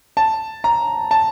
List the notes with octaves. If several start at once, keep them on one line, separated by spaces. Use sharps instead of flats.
A5
A#5
A5